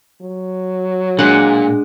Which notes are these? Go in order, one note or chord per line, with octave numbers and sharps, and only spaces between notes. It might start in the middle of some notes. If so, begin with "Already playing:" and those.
F#3
A#2 G#3 D4 G#4 F#5